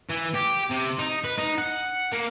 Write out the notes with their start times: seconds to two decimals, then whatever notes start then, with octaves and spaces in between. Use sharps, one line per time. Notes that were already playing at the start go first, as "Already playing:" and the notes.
0.10 E3
0.35 G4
0.70 C3
0.99 D#4
1.24 B4
1.38 D#4
1.58 F#5
2.13 A#3